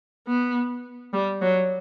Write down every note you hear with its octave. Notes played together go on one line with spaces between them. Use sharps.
B3
G3
F#3